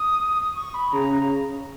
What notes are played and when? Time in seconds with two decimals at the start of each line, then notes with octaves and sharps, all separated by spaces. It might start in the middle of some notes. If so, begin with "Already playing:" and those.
Already playing: D#6
0.36 D#6
0.54 C#6
0.74 B5
0.92 C#3 A#5
1.11 A#5